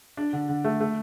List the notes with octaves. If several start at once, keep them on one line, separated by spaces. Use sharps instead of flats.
D4
D3
D3
A3
A3